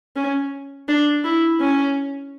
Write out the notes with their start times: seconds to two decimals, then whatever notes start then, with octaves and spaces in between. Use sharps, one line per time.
0.16 C#4
0.88 D4
1.25 E4
1.61 C#4